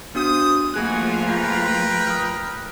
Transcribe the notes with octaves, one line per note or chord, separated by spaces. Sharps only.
B3 D4 F#4 C5 D#6
F3 A3 A#3 F4 F#4 G#4 G#5 F#6
A#4 B4 G5
D#6 F6